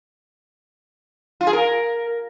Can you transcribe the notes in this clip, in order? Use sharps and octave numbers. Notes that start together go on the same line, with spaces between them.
F4
G#4
A#4